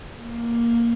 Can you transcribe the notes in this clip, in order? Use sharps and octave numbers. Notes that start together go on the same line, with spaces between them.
A#3